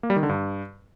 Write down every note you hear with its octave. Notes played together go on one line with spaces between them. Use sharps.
A#3
G3
D#3
D3
G2